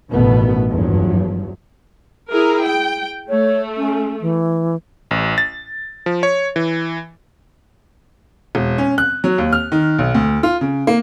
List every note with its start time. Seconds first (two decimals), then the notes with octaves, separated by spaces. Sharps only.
0.10 A1 G2 B2 D#3 A3 B3
0.69 F#1 E2 G2 F3 F#3
2.31 E4 G#4 A#4
2.63 G5
3.29 A3 C#5
3.77 C#4
4.21 E3
5.11 A1
5.38 A6
6.06 F3
6.23 C#5
6.56 E3
8.55 E1
8.78 C#4
8.98 F#6
9.24 F#3
9.38 D#2
9.53 F6
9.72 D#3
9.99 B1
10.15 D2
10.43 F4
10.61 C#3
10.87 A#3